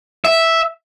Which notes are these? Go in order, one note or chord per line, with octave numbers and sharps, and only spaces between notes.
E5